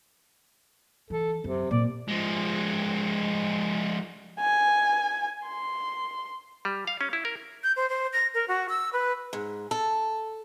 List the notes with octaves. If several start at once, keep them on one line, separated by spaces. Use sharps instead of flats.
E3 A4
F#2 C3
A#2 D5
F3 G#3
G#5
C6
G3
F5
C#4
E4
A#4
G6
C5
C5
A#6
A#4
F#4
E6
B4
G#2
A4